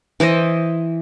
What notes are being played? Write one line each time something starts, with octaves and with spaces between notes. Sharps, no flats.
E3 E4 C5 D#5